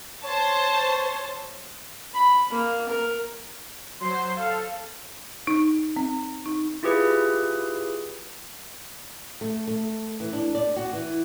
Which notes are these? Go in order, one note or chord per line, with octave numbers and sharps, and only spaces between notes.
C5 C#5 A5
B5
A#3
A#4
F#3 C5 C6
A4 F5
D#4
C4
D#4
E4 F4 G4 G#4 B4
A3
A3
E3
D4
D5
F#4
E3